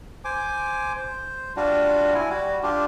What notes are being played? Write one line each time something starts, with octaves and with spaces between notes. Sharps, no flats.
C5 G#5 D6
C5
G3 D4 F4 F#4
E4 G#5
G3 F#4
D4 F4 G4